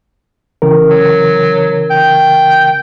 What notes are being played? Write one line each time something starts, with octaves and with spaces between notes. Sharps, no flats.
C#3 E3 A#4
F#3
G5